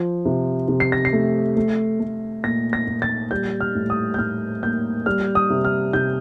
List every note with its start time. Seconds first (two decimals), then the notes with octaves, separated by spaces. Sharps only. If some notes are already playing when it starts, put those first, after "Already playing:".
Already playing: F3
0.26 C3
0.68 C3
0.80 C7
0.92 A#6
1.05 C7
1.13 A3
1.56 A3
2.00 A3
2.44 A#2 A#6
2.73 A#6
2.87 A#2
3.02 A6
3.31 G3 G6
3.61 F6
3.75 A2
3.90 D#6
4.14 G6
4.19 A2 F6
4.63 A#3 G6
5.06 G3 F6
5.35 D#6
5.50 C3
5.65 F6
5.93 C3 G6